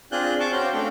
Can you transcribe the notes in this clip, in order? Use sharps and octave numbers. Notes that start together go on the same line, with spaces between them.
C4 D4 F4 G#4 F#6 G6
F5 A5 C#6 D6
C#4 F#4 C5 F5 G5 G6
A3 C4 D4 F5 G5